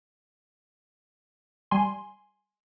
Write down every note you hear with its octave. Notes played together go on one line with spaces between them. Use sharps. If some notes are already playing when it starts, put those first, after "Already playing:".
G3 G#5 C6